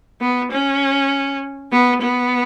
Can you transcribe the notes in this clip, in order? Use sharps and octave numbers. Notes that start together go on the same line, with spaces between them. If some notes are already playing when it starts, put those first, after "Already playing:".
B3
C#4
B3
B3